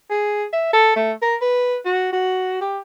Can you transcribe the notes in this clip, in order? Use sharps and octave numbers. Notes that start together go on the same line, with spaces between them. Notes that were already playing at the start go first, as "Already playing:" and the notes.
G#4
E5
A4
A3
A#4
B4
F#4
F#4
G4